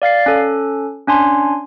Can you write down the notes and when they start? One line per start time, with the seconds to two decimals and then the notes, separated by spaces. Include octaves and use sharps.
0.02 D5 F5 A6 C7
0.26 C#4 A4
1.07 C#4 D4 G#5 C6